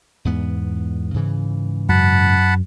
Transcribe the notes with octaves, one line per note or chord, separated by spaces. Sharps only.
E2 G#2 B3
G#2 C#3 E3
F#2 F#5 A5 B5